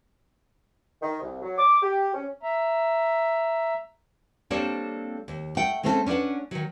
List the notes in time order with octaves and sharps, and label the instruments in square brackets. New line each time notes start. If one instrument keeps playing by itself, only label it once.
[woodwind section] D#3
C2
F#3
D6
G4
C#4
[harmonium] E5 A#5
[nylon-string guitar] G3 A#3 C4 D4 A4 C#5
D#2
A3 F#5 G5
G#3 A3 C4 C#4 E4 A4
C#4 D4 E4 B4 F#5
D#3 F#3